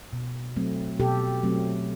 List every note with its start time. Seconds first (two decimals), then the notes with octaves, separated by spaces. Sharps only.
0.13 B2
0.56 F#3 A3 C4
0.99 B2 G4 A4
1.43 F#3 A3 C4